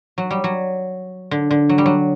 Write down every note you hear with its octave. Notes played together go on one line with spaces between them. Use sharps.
F#3
G3
F#3
D3
D3
F#3
G3
F#3